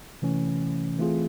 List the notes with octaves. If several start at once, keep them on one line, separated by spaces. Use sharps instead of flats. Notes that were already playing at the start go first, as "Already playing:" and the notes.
C3 E3 A3 C#4
E3 A3 C4 F4 G#4